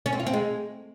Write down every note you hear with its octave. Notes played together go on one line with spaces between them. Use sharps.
C#4
C4
F4
C4
G#3